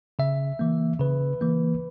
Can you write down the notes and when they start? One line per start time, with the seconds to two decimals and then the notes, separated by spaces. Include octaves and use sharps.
0.19 C#3 E5
0.59 E3 A#3
1.00 C#3 B4
1.41 E3 A#3